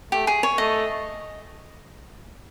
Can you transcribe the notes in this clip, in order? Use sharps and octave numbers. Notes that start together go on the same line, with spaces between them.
A3 G4
G#4
C#5
A3 D#5